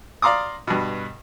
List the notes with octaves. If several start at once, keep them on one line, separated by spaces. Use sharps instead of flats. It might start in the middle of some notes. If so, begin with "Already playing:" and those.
D5 F5 A#5 C6 D6 D#6
G2 B2